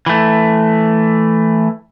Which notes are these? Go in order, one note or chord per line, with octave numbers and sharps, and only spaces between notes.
E3 A3